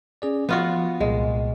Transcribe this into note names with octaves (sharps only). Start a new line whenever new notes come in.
C#4 G#4 D5
F3 B3 F4 F#4
C2 A#2 G#3